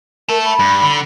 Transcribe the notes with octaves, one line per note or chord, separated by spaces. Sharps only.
A#4 E5 A5
B5
G2
D3